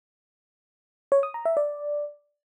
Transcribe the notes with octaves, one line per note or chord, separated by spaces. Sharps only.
C#5
D#6
A#5
E5
D5